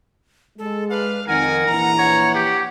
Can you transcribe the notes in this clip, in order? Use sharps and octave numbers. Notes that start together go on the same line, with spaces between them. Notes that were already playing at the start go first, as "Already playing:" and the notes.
G#3 A4
D4 B4 F5
F2 D#3 A#4 F#5 G#5
A#1 E3 A#5
C#5 F#5
G4